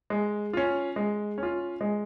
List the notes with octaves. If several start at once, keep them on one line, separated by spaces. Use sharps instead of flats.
G#3
C#4 F4
G#3
C#4
F4
G#3